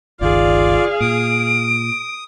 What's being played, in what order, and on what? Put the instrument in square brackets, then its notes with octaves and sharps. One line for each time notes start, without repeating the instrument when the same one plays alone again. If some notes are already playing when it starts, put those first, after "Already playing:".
[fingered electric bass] G1 C#2 D#3 [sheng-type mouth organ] F4 D5 [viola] G#4 F5
[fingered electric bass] A#2 [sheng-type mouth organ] D#6 [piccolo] D7